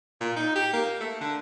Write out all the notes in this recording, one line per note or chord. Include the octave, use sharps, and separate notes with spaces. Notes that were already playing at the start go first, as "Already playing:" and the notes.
A#2
D#4
G4
A#3
A3
D3